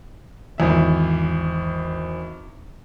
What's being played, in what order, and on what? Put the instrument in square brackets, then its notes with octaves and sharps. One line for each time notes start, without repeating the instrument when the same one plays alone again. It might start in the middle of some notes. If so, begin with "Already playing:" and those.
[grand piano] G#1 E2 E5